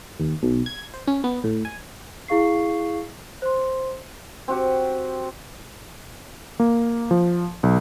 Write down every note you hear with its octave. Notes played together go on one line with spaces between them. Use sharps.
D#2
B1
G#6
C5
C#4
B3
A2
G#5
E4 G#4 F5 C#6 C7
C5 C6
C4 F#4 G4
A#3
F3
B1